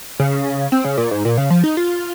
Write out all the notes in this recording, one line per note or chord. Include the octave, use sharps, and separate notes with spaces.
C#3
C4
C#3
A#2
G#2
A#2
C#3
F3
D#4
F4